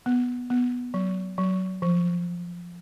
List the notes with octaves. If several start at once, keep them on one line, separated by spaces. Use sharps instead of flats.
B3
B3
F#3
F#3
F3